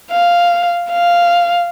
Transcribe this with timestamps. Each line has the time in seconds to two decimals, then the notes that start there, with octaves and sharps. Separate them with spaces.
0.12 F5
0.91 F5